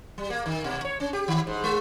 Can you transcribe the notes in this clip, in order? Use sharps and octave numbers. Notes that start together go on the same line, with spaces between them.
G3
A#3
D#3
B2
C#5
C#4
G4
D#3
G#2
G#3